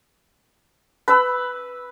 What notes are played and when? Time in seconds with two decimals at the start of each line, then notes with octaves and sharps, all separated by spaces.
1.08 B4 B5 E6